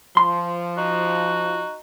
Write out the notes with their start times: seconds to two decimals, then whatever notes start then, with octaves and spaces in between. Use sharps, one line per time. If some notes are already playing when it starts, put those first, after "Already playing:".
0.17 F3 C6
0.78 D#4 F#4